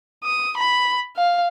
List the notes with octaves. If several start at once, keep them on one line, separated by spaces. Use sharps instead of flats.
D#6
B5
F5